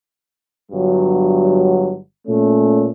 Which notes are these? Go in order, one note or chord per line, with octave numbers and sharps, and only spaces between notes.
G1 G2 F#3
A#2 A3 C#4